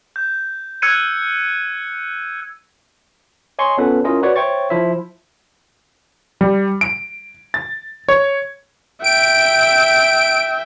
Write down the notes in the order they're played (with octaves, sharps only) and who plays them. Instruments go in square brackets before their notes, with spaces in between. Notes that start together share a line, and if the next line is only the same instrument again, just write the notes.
[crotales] G6
E6 F#6 G#6 C#7 D#7
[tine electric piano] C#5 D#5 G#5 C6 C#6
B3 C#4 F4 A4 B4
C#4 E4 F4 A#4 D#5
F#4 B4 C#5 D5
C5 C#5 E5 G5 C#6 A6
F3 E4 C5 E5
[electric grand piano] G3
D7
A6
C#5
[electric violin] E5 G5 [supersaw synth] D7